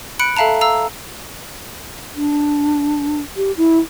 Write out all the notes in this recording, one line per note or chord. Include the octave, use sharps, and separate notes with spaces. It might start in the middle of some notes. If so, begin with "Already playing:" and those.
B5 F#6 C#7 D7
A4 E5 F5 A5 A#5
F5 A#5 E6
D4
G4
E4